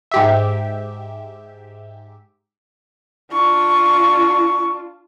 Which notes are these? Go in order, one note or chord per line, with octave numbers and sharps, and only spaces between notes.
G#2 G4 E5
D4 F4 C#6